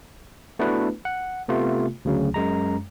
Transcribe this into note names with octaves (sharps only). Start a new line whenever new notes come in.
A3 B3 D4 E4 F#4 B4
F#5
C3 A3 B3 F4
D2 C#3 F#3
F#2 G#3 A#5